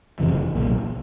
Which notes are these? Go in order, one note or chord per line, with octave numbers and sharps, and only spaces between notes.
F#1 F2 C3 E3
B1 A#2 F#3